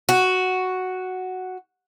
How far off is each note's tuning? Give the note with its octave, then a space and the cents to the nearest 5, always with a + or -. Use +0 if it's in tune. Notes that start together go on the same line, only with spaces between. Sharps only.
F#4 +0